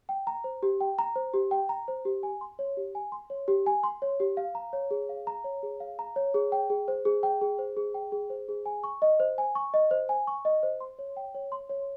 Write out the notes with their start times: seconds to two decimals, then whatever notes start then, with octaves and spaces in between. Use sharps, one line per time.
0.09 G5
0.27 A#5
0.44 C5
0.63 G4
0.80 G5
0.99 A#5
1.16 C5
1.34 G4
1.51 G5
1.69 A#5
1.88 C5
2.05 G4
2.23 G#5
2.41 C6
2.59 C#5
2.77 G4
2.95 G#5
3.12 C6
3.30 C#5
3.48 G4
3.66 G#5
3.83 C6
4.02 C#5
4.20 G4
4.37 F5
4.55 A#5
4.73 C#5
4.91 G#4
5.09 F5
5.27 A#5
5.44 C#5
5.63 G#4
5.80 F5
5.99 A#5
6.16 C#5
6.34 G#4
6.52 G5
6.70 G#4
6.88 C5
7.05 G#4
7.23 G5
7.41 G#4
7.59 C5
7.77 G#4
7.94 G5
8.12 G#4
8.30 C5
8.48 G#4
8.66 G#5
8.84 C#6
9.02 D#5
9.20 C5
9.38 G#5
9.55 C#6
9.74 D#5
9.91 C5
10.09 G#5
10.27 C#6
10.45 D#5
10.63 C5
10.80 C6
10.99 C#5
11.17 G5
11.35 C#5
11.52 C6
11.69 C#5